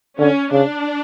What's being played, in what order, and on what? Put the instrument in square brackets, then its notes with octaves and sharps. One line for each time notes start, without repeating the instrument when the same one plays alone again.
[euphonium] D3 [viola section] C#4
[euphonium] C#3 [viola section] D4